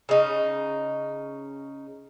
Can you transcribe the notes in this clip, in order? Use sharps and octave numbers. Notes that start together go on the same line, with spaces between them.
C#3 D#4